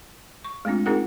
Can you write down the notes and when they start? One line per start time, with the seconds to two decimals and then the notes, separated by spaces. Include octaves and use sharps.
0.45 C#6
0.65 G#3 A3 C4 D4 F4
0.86 C4 D#4 F4 G#4 A#4 F#5